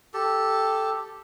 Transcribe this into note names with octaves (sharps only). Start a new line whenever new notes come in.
G4 A4